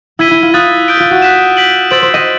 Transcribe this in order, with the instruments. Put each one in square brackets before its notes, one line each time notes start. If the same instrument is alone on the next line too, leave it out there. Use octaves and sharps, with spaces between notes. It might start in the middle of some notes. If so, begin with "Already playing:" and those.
[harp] E4 [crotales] E6 G#6 B6 D#7 G7
[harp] E4
F4
[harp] F4 [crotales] D#6 F#6 A6
[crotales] D#6 G6 B6 D7 G7
[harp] F4
F#4
[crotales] F#6 B6 E7
G6 B6 D7 F#7
[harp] C5 [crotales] E6 A6 D7 F#7
[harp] C5
D#5